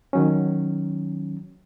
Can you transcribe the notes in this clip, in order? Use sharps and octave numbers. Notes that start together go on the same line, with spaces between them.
D#3 F#3 C#4